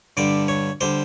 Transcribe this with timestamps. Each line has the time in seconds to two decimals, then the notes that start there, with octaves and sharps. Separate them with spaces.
0.17 G2 D3 G3 D5
0.48 C#5
0.81 D3 G3 C5